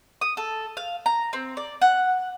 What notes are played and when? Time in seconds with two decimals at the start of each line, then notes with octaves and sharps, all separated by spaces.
0.21 D#6
0.37 A4
0.77 F5
1.06 A#5
1.33 C4
1.57 D5
1.82 F#5